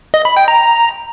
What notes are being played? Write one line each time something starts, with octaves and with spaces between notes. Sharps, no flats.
D#5
B5
G5
A#5